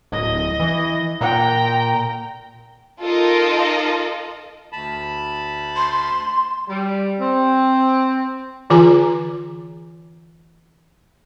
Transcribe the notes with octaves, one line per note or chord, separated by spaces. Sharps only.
D1 D#5
E3
A#2 G5 A#5
D#4 F4 A4 A#4 D#5
D2 A5 B5
C6
G3
C4
D3 E3 F4 G#4 G#5 A#5